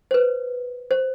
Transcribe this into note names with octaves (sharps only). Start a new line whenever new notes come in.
C5
B4
C5